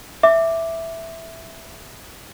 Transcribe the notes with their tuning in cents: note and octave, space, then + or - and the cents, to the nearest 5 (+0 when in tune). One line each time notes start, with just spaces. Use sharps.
E5 +0 D6 +0